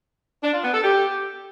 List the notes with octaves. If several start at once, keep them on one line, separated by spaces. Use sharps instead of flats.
D4
F4
B3
A4
G4